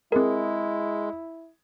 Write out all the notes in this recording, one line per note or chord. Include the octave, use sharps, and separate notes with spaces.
G#3 C4 E4 G#4 A#4